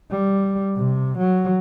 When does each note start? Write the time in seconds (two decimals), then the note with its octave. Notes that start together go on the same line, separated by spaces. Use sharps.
0.11 G3
0.77 C3
1.18 F#3